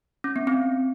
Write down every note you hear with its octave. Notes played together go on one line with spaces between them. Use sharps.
C#4
B3
C4